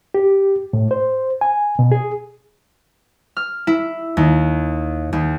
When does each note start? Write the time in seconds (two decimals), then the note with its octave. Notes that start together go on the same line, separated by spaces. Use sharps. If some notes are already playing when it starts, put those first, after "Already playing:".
0.14 G4
0.73 A2
0.91 C5
1.41 G#5
1.79 B2
1.92 G#4
3.37 F6
3.67 E4
4.17 D#2
5.13 D#2